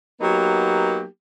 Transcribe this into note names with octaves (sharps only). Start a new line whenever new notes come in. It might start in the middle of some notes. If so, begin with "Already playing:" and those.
F#3 A#3 B3 D#4 G4